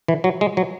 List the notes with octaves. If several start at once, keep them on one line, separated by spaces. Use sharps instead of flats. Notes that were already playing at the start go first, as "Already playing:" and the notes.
E3
F#3
G#3
F#3